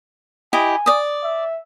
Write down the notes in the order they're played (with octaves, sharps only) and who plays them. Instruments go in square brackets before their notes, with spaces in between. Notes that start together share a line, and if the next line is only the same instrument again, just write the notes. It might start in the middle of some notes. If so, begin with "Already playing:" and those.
[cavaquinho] E4 G4 D#5 [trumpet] G#5
[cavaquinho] D5 D#6
[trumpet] E5